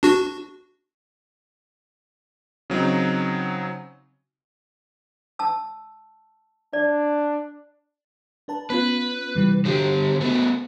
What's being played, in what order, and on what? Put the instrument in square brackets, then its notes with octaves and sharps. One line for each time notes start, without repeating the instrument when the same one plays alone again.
[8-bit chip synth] D4 F#4
[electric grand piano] C#3 F#3 C4 D#4
[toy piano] A5 E6
[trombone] D4 [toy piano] D5
[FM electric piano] D4 B4 A5
[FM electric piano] B3 C#4 F4 [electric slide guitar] B4
[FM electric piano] C3 E3 G3
[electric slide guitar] D3 G4 [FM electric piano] F#4 C5
[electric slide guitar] A3 B3